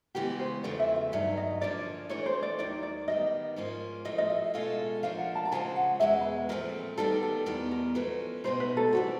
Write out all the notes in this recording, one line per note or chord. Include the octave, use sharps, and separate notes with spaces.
C#3 E3 G#3 B3 G4
C5
E2 C#3 F3 A3 D5
E5
E5
G2 D#3 F#3 E5
D#5
D3 F3 A#3 C#4 D5
E3 A3 D4 C#5
C5
D5
D#2 D#3 F#3 D5
D5
D#3 G3 B3 D#5
G#2 F3 A#3 C#4 F4
A2 F3 A3 D#5
D#5
E5
B2 G#3 C#4 F4 A4 F5
F3 A#3 D4 F5
F#5
A5
A5
C#3 F3 G#3 C#4 G#5
F#5
E2 B2 G#3 E5
B4
A#2 F3 A3 C4 A#4
D#3 G3 B3 A4
A4
E2 B2 G3 B3 A#4
A#4
F3 A3 C#4 F#4 B4
B2 G#3 B3 D#4 C5
B4
A4
E3 G3 C4 F#4